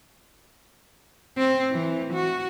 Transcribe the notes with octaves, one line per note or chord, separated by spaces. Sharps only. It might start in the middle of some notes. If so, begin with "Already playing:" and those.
C4
E3
F#4